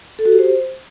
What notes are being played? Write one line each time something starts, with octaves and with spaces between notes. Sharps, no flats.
A4
F#4
G4
C5